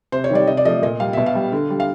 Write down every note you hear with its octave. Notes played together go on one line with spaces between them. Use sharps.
C3 C5
C#5
D#3 G3 D5
C3 D#5
D5
F3 A3 D#5
A#2 D#5
G3 F5
B2 E5
F5
G3
D3
G3
F5